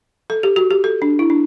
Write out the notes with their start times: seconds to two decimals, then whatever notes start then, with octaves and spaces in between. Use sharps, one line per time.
0.30 A4
0.43 G4
0.56 F#4
0.71 G4
0.84 A4
1.02 D4
1.19 E4
1.30 D4